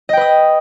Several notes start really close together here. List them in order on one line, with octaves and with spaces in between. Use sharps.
D#5 G5 B4 D#6